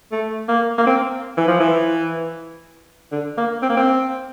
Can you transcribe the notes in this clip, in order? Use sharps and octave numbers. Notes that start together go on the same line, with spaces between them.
A3
A#3
A#3
C4
E3
F3
E3
D3
A#3
C4
A#3
C4